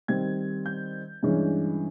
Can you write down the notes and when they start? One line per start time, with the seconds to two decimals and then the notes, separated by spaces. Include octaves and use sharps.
0.08 D#3 G3 C4 D#4 G#6
0.66 G6
1.23 G2 E3 G#3 C#4